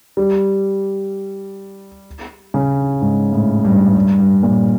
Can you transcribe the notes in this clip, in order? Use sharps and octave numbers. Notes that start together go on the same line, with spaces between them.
G3
C#3
G#2
A2
G2
G2
G2
A#2